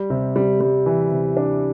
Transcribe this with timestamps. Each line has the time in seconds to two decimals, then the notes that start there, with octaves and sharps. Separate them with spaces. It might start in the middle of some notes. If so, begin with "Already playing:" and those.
Already playing: G3
0.10 C3
0.36 G3
0.61 G3
0.86 E3
1.11 C3
1.37 D4